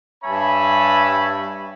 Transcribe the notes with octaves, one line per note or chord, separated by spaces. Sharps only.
G2 C#5 E5 G#5 A5 B5